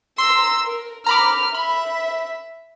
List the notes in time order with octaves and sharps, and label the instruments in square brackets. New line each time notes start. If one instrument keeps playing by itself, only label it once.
[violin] A#5 E6 [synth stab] C6
[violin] A#4
[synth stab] A#5 B5 D6 [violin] F6
[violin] E5 [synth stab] B5